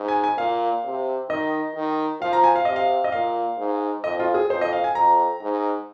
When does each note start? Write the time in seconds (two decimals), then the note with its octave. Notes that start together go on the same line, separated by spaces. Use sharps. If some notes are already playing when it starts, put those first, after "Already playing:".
Already playing: G#2
0.08 G#5
0.24 G#5
0.38 A#2 F5
0.84 C3
1.29 D#3 D#5
1.75 D#3
2.21 F3 F5
2.33 A#5
2.44 G#5
2.55 F5
2.65 C3 D#5
2.76 F5
3.04 D#5
3.12 A#2 F5
3.59 G#2
4.04 F2 D#5
4.20 F4
4.34 G#4
4.49 F2 C5
4.61 D#5
4.73 F5
4.84 G#5
4.95 F2 A#5
5.41 G#2